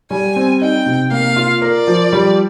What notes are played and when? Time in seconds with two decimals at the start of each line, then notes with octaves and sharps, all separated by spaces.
0.10 G3 G#5
0.36 C4
0.61 D#4 G5
0.86 C3
1.11 A#3 F5
1.36 F4
1.62 A#4 D5
1.87 F3
2.13 G3